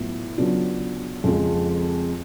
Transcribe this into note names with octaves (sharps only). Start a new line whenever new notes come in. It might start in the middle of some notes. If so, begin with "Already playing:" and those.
Already playing: A2 F#3 B3 F4
C#3 F#3 B3 D4 F4
F2 C#3 F3 G#3